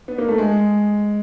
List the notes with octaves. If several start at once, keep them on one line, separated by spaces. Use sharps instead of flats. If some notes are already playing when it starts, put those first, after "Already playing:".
B3
A#3
A3
G#3